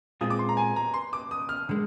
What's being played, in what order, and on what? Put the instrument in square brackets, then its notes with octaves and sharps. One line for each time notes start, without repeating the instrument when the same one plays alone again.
[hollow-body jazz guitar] A#2 G#3 C4 F4 G#4 [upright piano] D#6
[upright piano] D6
C6
A#5
G#5
A#5
C6
D6
D#6
F6
[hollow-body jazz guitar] D3 G#3